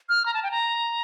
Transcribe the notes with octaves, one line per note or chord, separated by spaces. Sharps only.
F6
A#5
A5
G5
A#5